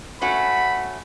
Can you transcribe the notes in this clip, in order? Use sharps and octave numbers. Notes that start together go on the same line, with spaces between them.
A3 C#4 F#4 B5